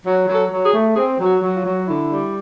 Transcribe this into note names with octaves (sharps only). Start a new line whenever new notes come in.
F#3
F#3
A4
F#3
G#4
A3
C4 G#4
F#3
F#4
F#3
F4
F#3
D3 E4
G3